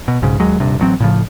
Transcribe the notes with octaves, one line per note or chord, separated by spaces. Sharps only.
B2
B1 G#2 C#3
D#2 F#3 G#3
D#1 G2 C3
A1 F#3 C4
A2 C#3 F3